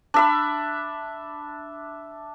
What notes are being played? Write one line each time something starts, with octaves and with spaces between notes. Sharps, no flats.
D4 E5 B5